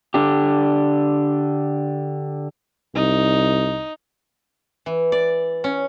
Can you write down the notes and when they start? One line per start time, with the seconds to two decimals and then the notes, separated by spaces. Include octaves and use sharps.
0.14 D3 D4 G4
2.95 C2 D#4
4.86 E3
5.12 D5
5.64 C#4